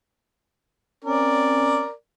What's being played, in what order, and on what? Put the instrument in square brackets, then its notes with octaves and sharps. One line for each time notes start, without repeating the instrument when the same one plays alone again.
[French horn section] C4 C#4 [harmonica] A#4 D5